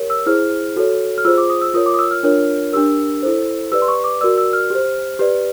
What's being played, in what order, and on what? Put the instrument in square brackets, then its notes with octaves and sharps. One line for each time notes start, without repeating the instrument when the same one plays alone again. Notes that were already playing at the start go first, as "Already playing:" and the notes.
Already playing: [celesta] G4 A#4 C#5
E6
E4 G#4 C5 F6
F#4 A4 C#5
F6
F4 G#4 C5 E6
D6
D#6
E6
F4 A#4 C#5 D#6
D6
D#6
E6
F6
D4 F4 A#4 C#5
D4 G4 A#4 E6
E4 A4 C5
G4 B4 D5 E6
C6
C#6
D6
F#4 A#4 D5 E6
E6
F6
G4 C5
G4 B4 D5